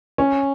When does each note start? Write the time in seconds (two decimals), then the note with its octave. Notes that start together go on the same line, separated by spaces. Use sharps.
0.18 C#4